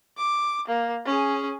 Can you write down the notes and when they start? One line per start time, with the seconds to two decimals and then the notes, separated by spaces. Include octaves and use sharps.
0.17 D6
0.68 A#3
1.05 C#4 G#4